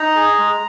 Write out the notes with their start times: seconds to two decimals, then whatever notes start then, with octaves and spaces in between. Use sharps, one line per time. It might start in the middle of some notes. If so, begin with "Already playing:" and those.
Already playing: D#4 A#5
0.16 G#4
0.39 G#3